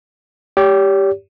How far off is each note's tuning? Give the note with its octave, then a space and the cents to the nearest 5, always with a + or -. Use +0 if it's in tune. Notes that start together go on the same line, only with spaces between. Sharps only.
G4 +0 C#5 +45